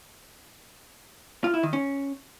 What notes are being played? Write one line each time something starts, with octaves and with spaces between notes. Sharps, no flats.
F4
E4
D#3
C#4